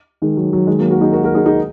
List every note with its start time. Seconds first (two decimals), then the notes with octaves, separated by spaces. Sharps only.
0.22 D#3 G#3
0.37 F#3
0.53 F#3
0.67 D#3 G#3
0.79 F#3 A#3
0.90 F#4 A#4
1.01 D#4 G#4
1.12 F#4 A#4
1.23 F#4 A#4
1.35 D#4 G#4
1.46 D#4 G#4